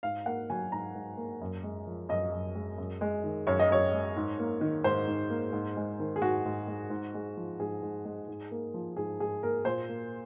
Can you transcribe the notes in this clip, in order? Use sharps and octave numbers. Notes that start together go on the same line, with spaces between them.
G#2 F5
A#3 F#5
F#3 G#5
G#2 A#5
G#2
A#3
F#2
G#3
F3
F#2 D#5
F#2
G#3
F#2
G#3
D#3
F#2 C#5
D#5
F#2 C#5
G#3
G#2
A#3
D#3
G#2 C5
G#2
A#3
G#2
G#3
D#3
G#4
G#2 F#4
G#2
G#3
G#2
G#3
F3
G#2 G#4
G#2
G#3
G#2
A#3
F3
G#2 G#4
G#2 G#4
A#3 A#4
A#2 C5
A#3